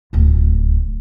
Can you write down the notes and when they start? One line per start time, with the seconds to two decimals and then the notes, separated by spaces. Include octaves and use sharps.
0.13 D1 C#2